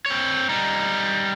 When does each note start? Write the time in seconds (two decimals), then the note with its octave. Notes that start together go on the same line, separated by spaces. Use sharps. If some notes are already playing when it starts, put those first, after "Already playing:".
0.06 C4 C#5
0.49 G3 D#4